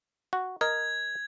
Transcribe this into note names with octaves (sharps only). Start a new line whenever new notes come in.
F#4
A#4 D#5 G#6